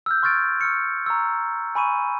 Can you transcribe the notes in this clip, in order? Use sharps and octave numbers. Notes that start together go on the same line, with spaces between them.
E6 F6 G6
C6 C#6 F6 G#6 A6 D7
C#6 E6 F6 C#7
A#5 C#6 E6
G#5 B5 C#6 D#7